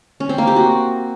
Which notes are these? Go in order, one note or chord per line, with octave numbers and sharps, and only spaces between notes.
C#4
C4
A#3
G4
F#4